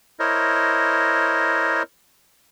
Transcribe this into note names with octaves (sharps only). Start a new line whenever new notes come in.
E4 A#4 C5 C#5 D#5